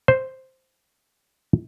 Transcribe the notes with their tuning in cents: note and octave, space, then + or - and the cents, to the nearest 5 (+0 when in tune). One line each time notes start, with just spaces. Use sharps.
C5 +0